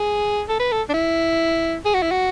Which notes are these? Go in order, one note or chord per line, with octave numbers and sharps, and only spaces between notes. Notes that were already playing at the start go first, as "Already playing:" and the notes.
Already playing: G#4
A4
B4
A4
D4
E4
G#4
F#4
E4
F#4